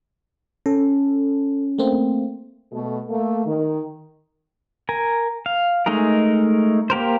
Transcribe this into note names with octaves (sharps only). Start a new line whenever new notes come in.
C#4 A4
A3 A#3 C4
B2 A3
A3 A#3
D#3
A#4 G#5
F5
G#3 A3 D#4 G#4 A#4
A#3 G4 A#4 C5